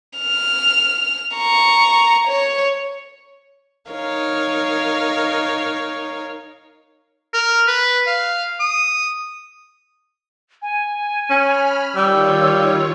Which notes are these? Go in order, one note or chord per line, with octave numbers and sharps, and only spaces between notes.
F6
A#5 C#6
C#5
D#4 A#4 C#5 F5
A#4
B4
F5
D#6
G#5
C#4 B5 F6
D#3 G3 F4 C#5 E6